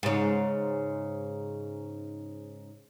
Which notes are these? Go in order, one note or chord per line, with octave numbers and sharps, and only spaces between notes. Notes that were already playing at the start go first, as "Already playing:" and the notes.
G#2 C#3